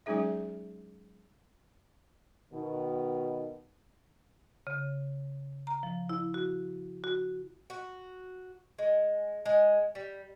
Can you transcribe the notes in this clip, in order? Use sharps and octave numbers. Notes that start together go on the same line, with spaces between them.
F#3 G#3 C#4 D#4 G#4 E5
B2 D#3
C#3
A#5
F3
E4
F#4
F#4
F#4
G#3
G#3
G3